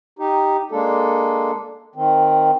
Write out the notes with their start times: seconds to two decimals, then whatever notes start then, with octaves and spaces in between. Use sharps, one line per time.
0.19 D#4 G4
0.72 G#3 A#3 D4 A4
1.95 D#3 C4